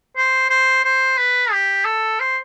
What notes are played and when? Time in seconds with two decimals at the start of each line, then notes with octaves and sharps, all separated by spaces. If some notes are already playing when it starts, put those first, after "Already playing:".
0.17 C5
0.50 C5
0.84 C5
1.18 B4
1.52 G4
1.85 A4
2.20 C5